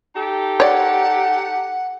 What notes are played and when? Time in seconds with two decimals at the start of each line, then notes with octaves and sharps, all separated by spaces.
0.16 D#4 G4 A4
0.60 C#5 D5 F#5